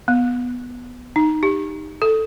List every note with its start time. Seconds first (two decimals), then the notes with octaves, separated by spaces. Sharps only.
0.08 B3
1.16 D#4
1.43 G4
2.02 A4